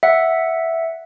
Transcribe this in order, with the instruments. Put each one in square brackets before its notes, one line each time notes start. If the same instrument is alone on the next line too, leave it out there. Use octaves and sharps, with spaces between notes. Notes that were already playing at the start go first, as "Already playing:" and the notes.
[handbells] E5 F#5